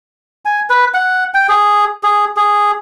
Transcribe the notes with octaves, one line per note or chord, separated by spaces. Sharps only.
G#5
B4
F#5
G5
G#4
G#4
G#4